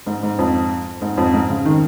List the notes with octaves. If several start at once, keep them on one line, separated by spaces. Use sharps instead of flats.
G#2
G#2
F2
G#2
F2
G#2
C#3
D#3